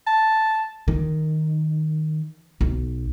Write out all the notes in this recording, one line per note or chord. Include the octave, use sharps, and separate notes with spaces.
A5
D#3
B1